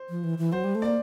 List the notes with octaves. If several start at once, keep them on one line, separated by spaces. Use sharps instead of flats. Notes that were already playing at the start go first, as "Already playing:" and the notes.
Already playing: C5
F3
E3
E3
F#3 C5
G3
A3
A#3 D5